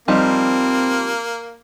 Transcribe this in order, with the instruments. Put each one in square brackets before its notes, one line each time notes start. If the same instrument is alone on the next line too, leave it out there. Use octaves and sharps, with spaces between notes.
[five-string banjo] F3 G3 D#4 [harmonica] A#3 [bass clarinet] C4